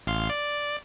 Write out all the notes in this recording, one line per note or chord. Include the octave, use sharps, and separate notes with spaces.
A1 F5 C6
D5